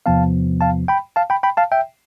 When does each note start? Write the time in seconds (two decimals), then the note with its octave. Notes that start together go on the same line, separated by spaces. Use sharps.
0.06 E2 C3 F3 B3 F5 A5
0.61 F5 A5
0.88 G5 B5
1.16 F5 A5
1.30 G5 B5
1.43 G5 B5
1.57 F5 A5
1.72 E5 G5